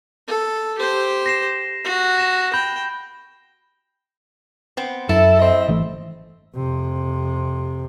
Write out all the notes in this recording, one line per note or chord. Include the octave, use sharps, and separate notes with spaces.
A4
G4 C5
A#6 C7 E7
F#4
A#6 E7
G5 B5 G6
B3 C4
F#2 E4 A4
C4 C5 D#5
G#1 E3 A3
F2 C3